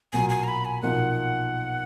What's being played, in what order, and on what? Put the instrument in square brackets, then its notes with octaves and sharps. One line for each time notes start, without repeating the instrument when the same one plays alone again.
[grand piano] B1 A#2 F#3 [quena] G#5
[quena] G#5
A#5
B5
G#5
[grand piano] B1 A#2 F3 A#3 D#4 [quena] F#5